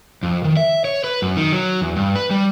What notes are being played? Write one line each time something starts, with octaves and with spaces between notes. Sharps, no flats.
F2
D#3
E5
C#5
B4
F#2
D#3
F#3
E2
G2
B4
G3